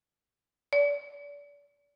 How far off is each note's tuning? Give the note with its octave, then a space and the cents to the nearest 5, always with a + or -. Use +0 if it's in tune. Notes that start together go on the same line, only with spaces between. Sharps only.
D5 -35